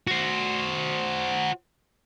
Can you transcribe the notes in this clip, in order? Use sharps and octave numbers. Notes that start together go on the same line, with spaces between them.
F#4 C5